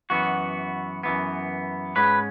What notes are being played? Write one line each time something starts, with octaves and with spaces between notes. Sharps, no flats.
F#2 E3 B3 F#4
F#2 E3 B3
G#2 G#3 C#4 B4